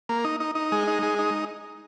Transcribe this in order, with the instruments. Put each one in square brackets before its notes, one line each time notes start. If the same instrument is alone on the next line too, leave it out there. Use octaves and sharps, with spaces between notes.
[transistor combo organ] A#3
D#4
D#4
D#4
G#3
D#4
G#3
D#4